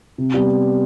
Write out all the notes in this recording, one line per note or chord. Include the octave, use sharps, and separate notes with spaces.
C3
G3 B3